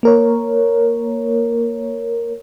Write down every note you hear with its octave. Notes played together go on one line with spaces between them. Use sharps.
A#3 A#4 C#5